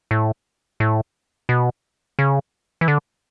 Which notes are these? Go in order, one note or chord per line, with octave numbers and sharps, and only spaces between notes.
A2
A2
B2
C#3
E3
D3